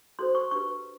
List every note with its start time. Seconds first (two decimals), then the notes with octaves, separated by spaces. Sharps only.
0.19 F#4 A4 C5 C6
0.35 C#6
0.51 D4 G4 B4 C#6